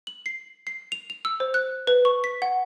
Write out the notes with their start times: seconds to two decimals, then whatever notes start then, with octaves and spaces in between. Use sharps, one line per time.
0.07 F#7
0.26 C7
0.67 C7
0.92 F7
1.10 F7
1.25 E6
1.40 C5
1.54 F#6
1.87 B4
2.05 C#6
2.24 B6
2.42 F#5